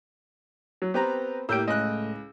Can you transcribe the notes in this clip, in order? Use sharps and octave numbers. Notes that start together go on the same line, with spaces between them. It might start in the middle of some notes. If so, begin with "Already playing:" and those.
F#3
B3 C4 G4 B4 A#5
A2 A#3 G4 E6 G6 D7
C#2 D#5 F#6